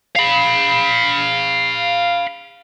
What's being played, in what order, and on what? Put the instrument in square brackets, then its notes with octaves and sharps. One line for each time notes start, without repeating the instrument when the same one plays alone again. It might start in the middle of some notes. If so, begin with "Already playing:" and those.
[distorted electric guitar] F5 B5